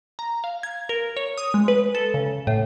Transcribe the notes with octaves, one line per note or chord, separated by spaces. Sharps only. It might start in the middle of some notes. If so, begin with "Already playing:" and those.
A#5
F5
G#6
A#4
C#5
D#6
G#3
B4
A4
C#3
A2